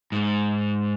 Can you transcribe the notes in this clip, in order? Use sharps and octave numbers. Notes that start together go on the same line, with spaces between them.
G#2